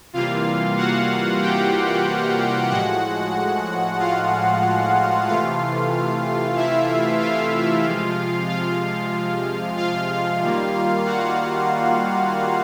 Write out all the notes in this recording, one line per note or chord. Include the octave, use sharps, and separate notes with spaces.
C3 E3 G3 A#3 F4 F5
F#4 F#5
G4 G5
A2 F3 G#3 F#4 F#5
F4 F5
C3 E3 A3 F4 F5
E4 E5
F4 F5
C3 F3 G#3
F4 F5
F4 F5
D#3 G3 A#3
F#4 F#5